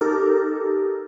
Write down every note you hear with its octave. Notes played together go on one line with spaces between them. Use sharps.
D#4 G4 A4 A#4